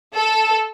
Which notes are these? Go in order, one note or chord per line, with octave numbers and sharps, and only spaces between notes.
A4